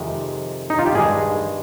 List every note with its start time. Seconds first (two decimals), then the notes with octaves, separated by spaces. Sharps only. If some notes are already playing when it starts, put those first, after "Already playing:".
Already playing: F2 C3 D#3 G#3
0.70 D#4
0.79 F4
0.86 G4
0.94 G2 D#3 G#3 G#4